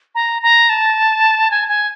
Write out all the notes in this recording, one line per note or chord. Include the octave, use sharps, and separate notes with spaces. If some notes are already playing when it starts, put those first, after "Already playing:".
A#5
A#5
A5
G#5
G#5